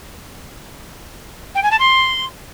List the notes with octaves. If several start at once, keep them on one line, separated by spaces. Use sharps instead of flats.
G5
G#5
A5
C6